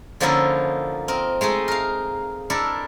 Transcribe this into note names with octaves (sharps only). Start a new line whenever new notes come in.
D3 F3 A#3 C#4 D#4 E4
C4 A#4 D#5
G#3 A3 D#4 G#4
A#4 F5
D4 E4 A4 A#4